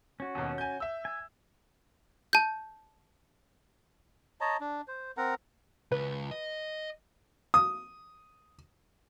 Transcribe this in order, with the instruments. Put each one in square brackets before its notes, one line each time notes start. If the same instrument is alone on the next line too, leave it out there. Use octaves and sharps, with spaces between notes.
[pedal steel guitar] C#4 F#4
[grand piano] D#2 B2
G#5 G6
E5 E6
[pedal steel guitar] G#5
[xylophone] A5 G6
[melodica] C#5 D#5 A5 A#5
D4
C5
C4 A#4 F#5 A#5
[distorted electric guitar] C#2 [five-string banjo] B4
[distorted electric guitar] D#5
[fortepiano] D#6